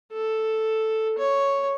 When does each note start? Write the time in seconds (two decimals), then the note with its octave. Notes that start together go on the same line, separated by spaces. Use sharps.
0.12 A4
1.18 C#5